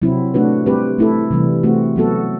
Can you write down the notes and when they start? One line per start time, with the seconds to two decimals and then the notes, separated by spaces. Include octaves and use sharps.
0.02 C3 F#3 C4 E4
0.34 A3 D4 F#4 B4
0.66 G3 C4 G4 B4
0.98 A3 E4 A4
1.31 C3 E3 G3
1.63 A3 C4 F#4
1.96 F#3 B3 F#4 A4